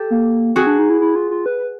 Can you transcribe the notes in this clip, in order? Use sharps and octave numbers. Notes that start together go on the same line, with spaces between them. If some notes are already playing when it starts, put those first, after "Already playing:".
Already playing: G4 A4
A#3
C4 F#4 G#4
D4
D#4
E4
E4
F4
F4
B4